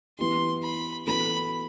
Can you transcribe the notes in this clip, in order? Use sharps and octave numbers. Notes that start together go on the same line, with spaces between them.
E3 B3 E4 G4 C6
B5
E3 B3 F#4 A4 B5